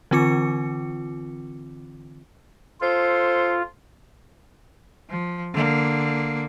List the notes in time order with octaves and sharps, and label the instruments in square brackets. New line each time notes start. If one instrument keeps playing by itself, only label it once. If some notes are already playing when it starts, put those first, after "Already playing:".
[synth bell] D3 E3 C4 F4 D6 C#7
[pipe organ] F4 [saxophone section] A4 C5
[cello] F3
D3 A#3